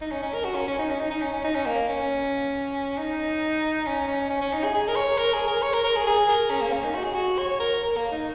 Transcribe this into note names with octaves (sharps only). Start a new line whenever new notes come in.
D#4
C#4
C#4
A#4
F#4
C#4
C#4
D#4
C#4
D#4
D#4
C#4
C#4
D#4
C#4
A#3
C#4
D#4
C#4
C#4
C#4
C#4
D#4
G#4
G#4
A#4
C#5
A#4
G#4
A#4
C#5
A#4
A#4
G#4
G#4
A#4
C#4
A#3
C#4
D#4
F#4
G#4
F#4
C#5
A#4
A#4
A#3
D#4